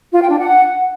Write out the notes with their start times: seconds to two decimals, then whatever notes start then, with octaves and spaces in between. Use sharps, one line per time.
0.12 F4
0.21 G5
0.30 D4
0.38 F#5